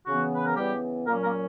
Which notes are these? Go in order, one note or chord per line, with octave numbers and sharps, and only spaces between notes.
C#3 E3 B3 F#4
B4
A#4
C#3 E3 G3 B3 G4
A#2 F#3 A#3 C#4 A#4
A#3 A#4